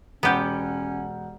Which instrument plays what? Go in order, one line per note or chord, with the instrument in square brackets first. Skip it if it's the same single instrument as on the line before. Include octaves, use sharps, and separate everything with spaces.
[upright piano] E1 F#5 G6 [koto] B3 G4 [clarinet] C#4